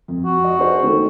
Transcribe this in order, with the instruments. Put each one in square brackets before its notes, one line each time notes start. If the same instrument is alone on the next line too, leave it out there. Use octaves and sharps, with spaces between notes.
[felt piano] F2
[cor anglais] F#4
[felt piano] D#5
G#4 C5
D#3 A3